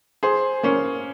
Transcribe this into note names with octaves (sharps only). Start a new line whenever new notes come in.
G#4 C5
A#3 C#4